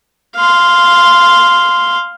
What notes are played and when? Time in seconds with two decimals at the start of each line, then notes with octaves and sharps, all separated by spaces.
0.36 F5 C6